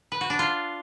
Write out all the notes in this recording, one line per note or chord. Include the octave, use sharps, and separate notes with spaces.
B4
F#4
D4
F4